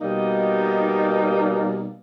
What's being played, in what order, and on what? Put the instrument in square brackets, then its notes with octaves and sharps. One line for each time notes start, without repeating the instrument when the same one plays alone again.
[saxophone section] B2 G3 A#3 D#4